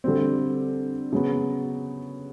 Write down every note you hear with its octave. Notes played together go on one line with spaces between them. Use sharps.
D3 G3 C4
C#3 F#3 B3